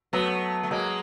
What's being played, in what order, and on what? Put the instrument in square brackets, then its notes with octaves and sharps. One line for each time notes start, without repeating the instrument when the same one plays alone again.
[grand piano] F#3 [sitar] A3 B3
[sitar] A3
[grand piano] F#3 [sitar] G#3 A#3